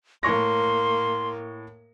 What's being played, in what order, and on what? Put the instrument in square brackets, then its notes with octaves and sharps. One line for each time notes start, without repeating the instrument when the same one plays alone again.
[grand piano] A2 C#6 A#6 [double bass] A#3 [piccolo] C6